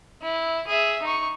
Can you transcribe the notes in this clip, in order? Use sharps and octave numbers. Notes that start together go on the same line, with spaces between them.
E4
G#4 E5
D#4 C#6